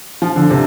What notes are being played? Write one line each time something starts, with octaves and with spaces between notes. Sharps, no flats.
F3
D3
C3